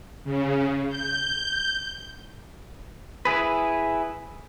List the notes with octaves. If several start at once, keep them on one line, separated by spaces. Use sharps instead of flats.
C#3
G6
E4 G#4 B4